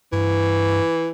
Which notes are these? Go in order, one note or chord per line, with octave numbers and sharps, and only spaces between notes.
G2 E3